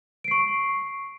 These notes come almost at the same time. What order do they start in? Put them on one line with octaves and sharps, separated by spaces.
D7 C7 C#6